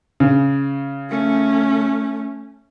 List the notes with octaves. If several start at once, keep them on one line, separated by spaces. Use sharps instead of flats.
C#3
A3 C#4